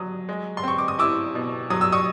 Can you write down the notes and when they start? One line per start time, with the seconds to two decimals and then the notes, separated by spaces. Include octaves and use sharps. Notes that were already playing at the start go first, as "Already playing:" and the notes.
Already playing: F#3 D#6
0.29 G#3
0.57 C6
0.63 C4 C#6
0.78 D6
0.88 D#6
0.99 E4 D6 E6
1.35 B2
1.70 F#3 D#6
1.81 E6
1.92 C#6 D#6